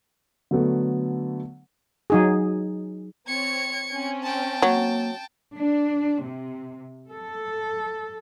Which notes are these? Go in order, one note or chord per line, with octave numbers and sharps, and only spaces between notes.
D3 F#3 A3 B3
F#3 D#4 G#4
C4 C#5 G#6 C#7
C4 C#4
G5 A5
F#3 A#3
D4
C3
A4